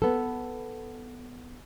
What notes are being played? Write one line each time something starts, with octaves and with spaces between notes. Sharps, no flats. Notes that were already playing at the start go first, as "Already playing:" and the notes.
B3 A4